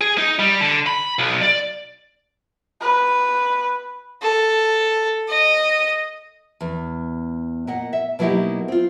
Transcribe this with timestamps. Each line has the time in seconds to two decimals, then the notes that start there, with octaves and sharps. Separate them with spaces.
0.01 G#4
0.18 D#4
0.39 G3
0.61 D3
0.86 B5
1.19 B1
1.42 D5
2.81 B4
4.22 A4
5.29 D#5
6.61 E2
7.67 A#2 D#5 F#5
7.93 E5
8.19 B2 F#3 A#3 D#4 E4 G4
8.68 C4 F4